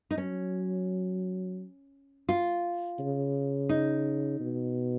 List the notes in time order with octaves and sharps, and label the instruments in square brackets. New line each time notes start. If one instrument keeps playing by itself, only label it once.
[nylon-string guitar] D#4
[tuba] F#3 [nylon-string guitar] C#4
[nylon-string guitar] F4
[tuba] C#3
[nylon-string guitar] D#4
[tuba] B2